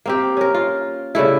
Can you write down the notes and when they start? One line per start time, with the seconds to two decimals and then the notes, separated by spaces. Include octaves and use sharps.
0.06 A#3 C4 G4
0.37 C#4 A#4
0.54 F4
1.15 C#3 G3 A3 E4